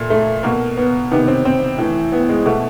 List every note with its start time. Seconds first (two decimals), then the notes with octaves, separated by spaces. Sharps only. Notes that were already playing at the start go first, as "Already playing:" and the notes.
Already playing: A#2 A3
0.10 A3
0.43 B2 A#3
0.77 B3
1.11 C3 D#3 B3
1.28 C4
1.45 C4
1.78 A2 E3
2.12 B3
2.29 G#3
2.46 B2 A3